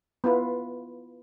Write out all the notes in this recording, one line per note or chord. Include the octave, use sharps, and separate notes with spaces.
B3 E4 F4 B4